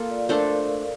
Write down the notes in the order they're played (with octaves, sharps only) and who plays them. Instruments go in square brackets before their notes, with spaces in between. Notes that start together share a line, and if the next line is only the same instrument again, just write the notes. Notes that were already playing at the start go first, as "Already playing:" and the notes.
Already playing: [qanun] A#3 F4 A4 [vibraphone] F5
[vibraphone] D5
[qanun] A3 D4 A4 C5 [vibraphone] A#4